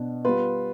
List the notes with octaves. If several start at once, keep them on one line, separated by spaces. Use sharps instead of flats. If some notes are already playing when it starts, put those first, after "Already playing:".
Already playing: B2 B3 D4
G3 B3 F4 B4